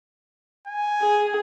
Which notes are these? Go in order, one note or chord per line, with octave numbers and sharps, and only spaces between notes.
G#5
G#4